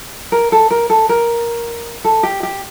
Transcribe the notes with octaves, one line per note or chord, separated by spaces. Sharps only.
A#4
A4
A#4
A4
A#4
A4
G4
G4